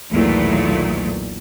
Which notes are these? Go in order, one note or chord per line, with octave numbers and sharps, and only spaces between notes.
B1 E2 A#2 D#3 F#3 A3